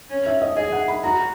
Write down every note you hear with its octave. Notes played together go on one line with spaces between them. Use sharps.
C#4
E5
D#5
G#4 D#5
F#5
B5
F#4 A#5